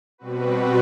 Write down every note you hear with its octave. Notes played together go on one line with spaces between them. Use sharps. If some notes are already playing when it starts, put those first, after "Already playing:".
B2 G3 C4 F#4 B4